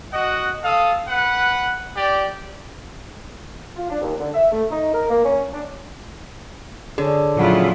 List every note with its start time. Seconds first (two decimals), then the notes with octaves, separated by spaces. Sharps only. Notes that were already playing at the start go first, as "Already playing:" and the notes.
0.13 F#4 D#5 F#5
0.63 A4 F5 D#6
1.08 B4 F#5
1.96 G4 D5
3.77 F4
3.90 D4
4.02 D#2
4.19 D3
4.34 E5
4.52 A3
4.70 D#4
4.94 A#4
5.09 A#3
5.25 C#4
5.53 D4
6.98 D3 G#4 C#5
7.36 A#2 C#3 F3 F#3 E4 F4 F#5